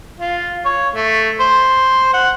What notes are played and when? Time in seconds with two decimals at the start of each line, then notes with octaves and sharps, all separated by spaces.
0.20 F4
0.65 C#5
0.95 A3
1.40 C5
2.14 F#5